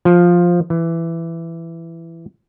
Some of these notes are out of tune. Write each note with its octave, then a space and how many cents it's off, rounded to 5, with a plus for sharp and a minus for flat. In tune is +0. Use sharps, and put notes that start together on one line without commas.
F3 +5
E3 +10